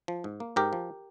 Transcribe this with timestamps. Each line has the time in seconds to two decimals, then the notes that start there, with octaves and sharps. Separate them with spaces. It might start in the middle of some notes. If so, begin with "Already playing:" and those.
0.08 F3
0.24 G#2
0.40 A#3
0.56 G#2 G4 A#4
0.73 F3